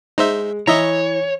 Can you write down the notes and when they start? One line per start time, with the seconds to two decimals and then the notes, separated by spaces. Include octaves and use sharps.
0.18 G#3 D#4 C5 E5
0.67 E3 C#5 D#5 E5 A#5